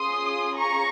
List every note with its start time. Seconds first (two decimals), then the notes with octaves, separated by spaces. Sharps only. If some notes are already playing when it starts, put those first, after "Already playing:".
Already playing: C#4 F4 G#4 C6 D#6
0.57 A#5 C#6